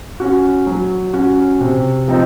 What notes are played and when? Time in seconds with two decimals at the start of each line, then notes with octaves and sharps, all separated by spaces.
0.20 C#4 F#4
0.67 F#3
1.13 C#4 F#4
1.61 C3
2.08 F3 C4 D#4